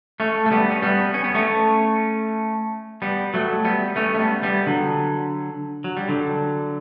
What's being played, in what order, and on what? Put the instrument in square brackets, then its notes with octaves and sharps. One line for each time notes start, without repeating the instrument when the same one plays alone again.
[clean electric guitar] A3 C#4
A3
G3 B3
C#4
G3 B3
C#4
B3
A3 C#4
G3 B3
F#3 A3
G3 B3
A3 C#4
A3
G3 B3
G3 B3
D3 F#3
F#3
G3
D3 F#3